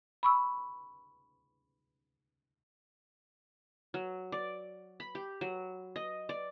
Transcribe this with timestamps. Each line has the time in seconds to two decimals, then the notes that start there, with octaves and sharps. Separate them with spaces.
0.23 B5 C#6 E6
3.94 F#3
4.32 D5
5.00 B5
5.15 G4
5.41 F#3
5.96 D#5
6.29 D5